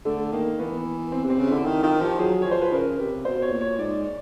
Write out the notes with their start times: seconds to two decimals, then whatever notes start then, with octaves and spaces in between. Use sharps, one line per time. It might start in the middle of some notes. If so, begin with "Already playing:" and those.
0.05 D3 A3
0.32 D#3 A#3
0.59 E3 B3
1.12 C4
1.24 C3
1.30 C4
1.38 C#3
1.47 D3 E4
1.65 D#3 E4
1.83 D#3 F4
2.00 F3 G4
2.19 F#3 G#4
2.42 F3 C#5
2.51 C5
2.62 B4
2.72 C#3 A#4
2.98 C3 B4
3.25 B2 C5
3.42 C#5
3.52 A#2
3.61 C#5
3.78 G#2 D5